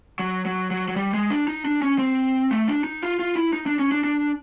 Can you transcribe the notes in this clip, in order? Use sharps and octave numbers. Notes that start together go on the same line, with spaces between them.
F#3
F#3
F#3
F#3
G3
G#3
D4
D#4
D4
C#4
C4
A3
D4
D#4
F4
F4
E4
D#4
D4
C#4
D4
D4